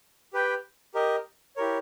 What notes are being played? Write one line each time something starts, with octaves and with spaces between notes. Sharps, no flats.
G4 B4 G5
G4 A#4 D#5
E4 G4 A#4 C#5